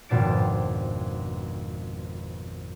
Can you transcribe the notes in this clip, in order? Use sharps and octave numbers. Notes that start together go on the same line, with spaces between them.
G#1 F2 B2 D4 A6 D7